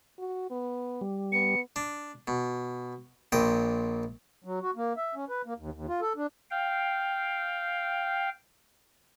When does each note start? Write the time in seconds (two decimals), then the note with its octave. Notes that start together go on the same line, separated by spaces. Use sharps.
0.19 F#4
0.51 B3
1.01 G3
1.32 B3 C#7
1.76 D4
2.28 B2
3.32 A#1 A#2 D#5 G5
4.44 F#3
4.62 F#4
4.76 A#3
4.97 E5
5.15 C#4
5.29 B4
5.46 A#3
5.58 D#2
5.74 D#2
5.88 F4
6.01 A4
6.16 D4
6.50 F5 G5